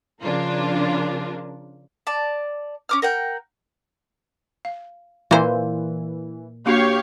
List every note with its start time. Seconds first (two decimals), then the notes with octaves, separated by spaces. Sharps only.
0.21 C#3 F3 D4 F4 A#4
2.07 D5 A5
2.89 C#4 D6 F6
3.02 A#4 F#5 G5
4.65 F5
5.31 A#2 E3 C5
6.66 A#3 D4 F#4 G4 C#5 F5